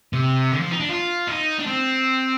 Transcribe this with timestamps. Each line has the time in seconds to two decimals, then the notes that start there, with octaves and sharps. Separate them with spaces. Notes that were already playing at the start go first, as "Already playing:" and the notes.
0.13 C3
0.52 D3
0.60 F3
0.71 D#4
0.80 D4
0.89 F4
1.28 D#4
1.59 D4
1.66 C4